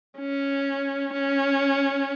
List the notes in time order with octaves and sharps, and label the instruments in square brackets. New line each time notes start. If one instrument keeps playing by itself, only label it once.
[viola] C#4
C#4